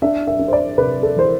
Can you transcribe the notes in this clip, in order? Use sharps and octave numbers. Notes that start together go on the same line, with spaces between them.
D4 E5
E5
D4
C5
D5
C3 B4
A4
E3 C5